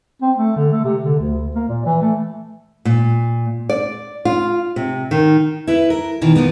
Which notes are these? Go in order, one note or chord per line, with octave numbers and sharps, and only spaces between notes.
C4
A3
D3
A3
C3
D3
D2
A#3
A#2
E3
A3
A#2
D5
F4
C3
D#3
E4 B4
A#4
B2 D#3 E3
A#2 F3 A#3 B3